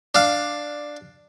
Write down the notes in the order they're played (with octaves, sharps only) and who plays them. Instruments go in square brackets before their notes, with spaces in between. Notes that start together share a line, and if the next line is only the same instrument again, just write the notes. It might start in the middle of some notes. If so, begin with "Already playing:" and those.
[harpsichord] D4 F5